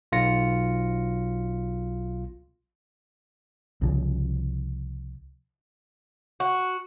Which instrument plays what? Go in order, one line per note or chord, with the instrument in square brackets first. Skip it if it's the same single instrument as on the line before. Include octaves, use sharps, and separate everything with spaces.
[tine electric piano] B1 F4 A#6 C#7
[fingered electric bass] C2 C#3 F3
[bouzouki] F#4